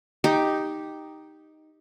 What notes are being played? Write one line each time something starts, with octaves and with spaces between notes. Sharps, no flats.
D#4 G4